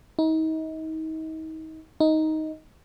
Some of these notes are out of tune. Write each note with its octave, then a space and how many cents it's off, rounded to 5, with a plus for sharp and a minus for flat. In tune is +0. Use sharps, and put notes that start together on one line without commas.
D#4 +35
D#4 +10